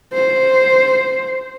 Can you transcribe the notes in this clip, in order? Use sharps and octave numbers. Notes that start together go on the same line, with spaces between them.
C5